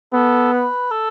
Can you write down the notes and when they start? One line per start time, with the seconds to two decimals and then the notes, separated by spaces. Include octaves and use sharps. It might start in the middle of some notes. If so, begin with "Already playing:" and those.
0.13 B3 A4
0.53 B4
0.91 A4